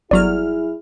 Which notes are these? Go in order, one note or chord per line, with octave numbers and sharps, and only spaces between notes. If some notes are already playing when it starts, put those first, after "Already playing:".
G1 F#3 E4 G#4 D5 C#6 F6